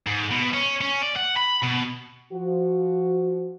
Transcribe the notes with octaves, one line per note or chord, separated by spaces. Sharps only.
G#2
B2
C#4
C#4
D5
F#5
B5
B2
F3 F#4